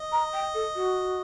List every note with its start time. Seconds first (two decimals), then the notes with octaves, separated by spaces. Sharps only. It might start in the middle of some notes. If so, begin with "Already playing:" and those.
Already playing: D#5
0.12 A#5
0.33 G5
0.54 A4
0.75 F#4